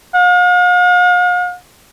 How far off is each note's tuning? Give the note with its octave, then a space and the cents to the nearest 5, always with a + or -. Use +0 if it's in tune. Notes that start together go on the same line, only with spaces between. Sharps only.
F5 +45